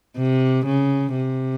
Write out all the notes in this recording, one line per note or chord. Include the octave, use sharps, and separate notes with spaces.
C3
C#3
C3